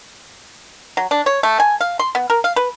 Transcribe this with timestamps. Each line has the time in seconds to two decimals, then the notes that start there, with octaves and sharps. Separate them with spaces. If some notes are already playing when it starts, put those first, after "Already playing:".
0.97 F#3
1.11 D4
1.26 C#5
1.43 A3
1.60 G#5
1.81 F5
1.99 C6
2.15 B3
2.30 A#4
2.44 F5
2.56 B4